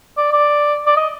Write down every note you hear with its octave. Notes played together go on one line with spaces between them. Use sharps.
D5
D5
D5
D#5